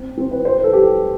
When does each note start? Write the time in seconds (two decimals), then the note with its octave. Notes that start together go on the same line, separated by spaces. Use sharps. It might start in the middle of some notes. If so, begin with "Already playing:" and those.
Already playing: C4
0.18 C4
0.31 B4
0.45 C5
0.55 B4
0.64 A4
0.73 G4